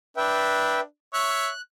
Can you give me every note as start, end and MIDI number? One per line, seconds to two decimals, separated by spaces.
0.17 0.84 62
0.17 0.80 71
0.17 0.80 76
0.17 0.80 79
1.14 1.49 73
1.14 1.49 76
1.14 1.61 90